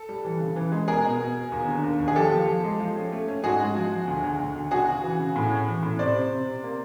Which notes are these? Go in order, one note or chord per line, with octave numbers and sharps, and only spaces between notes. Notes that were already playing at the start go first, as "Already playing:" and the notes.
Already playing: A4
G3
E3
C#3
E3
G#3
B2 G#4 A#4
B2
B2
B3
D#2
D3
D#2
D#2
G#4
F3 G4 A4
F3
F3
G#3
F3
C#4
A3
C#4
G#2 F#4 G#4
G#3
F3
F3
D2
D2
D2
D2
C#3 F#4 G#4
C#3
E3
C#3
A2
C#4
E3
A2
C3 C5 D5
C3
C3
C3
A#3